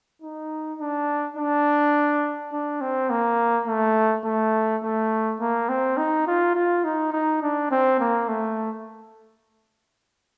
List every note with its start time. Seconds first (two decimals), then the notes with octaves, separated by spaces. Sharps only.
0.22 D#4
0.80 D4
1.37 D4
2.52 D4
2.81 C4
3.10 A#3
3.67 A3
4.25 A3
4.83 A3
5.40 A#3
5.69 C4
5.97 D#4
6.27 F4
6.55 F4
6.84 D#4
7.13 D#4
7.42 D4
7.71 C4
8.00 A#3
8.28 A3